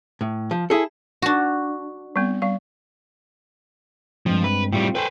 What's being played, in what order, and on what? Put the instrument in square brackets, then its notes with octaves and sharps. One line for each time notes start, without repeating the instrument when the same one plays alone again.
[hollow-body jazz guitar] A2
F3
E4 G#4 A4
[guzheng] D4 F#4
[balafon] G3 B3 C4
G3 F5
[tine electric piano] G2 G#3 C4 [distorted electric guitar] F3
[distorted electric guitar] B4
[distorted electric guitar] A2 G3 [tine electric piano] C4 F4 G5
[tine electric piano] A4 G5 G#5 [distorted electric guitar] B4 C5